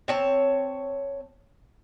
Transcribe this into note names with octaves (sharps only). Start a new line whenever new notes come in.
C4 C#5 A5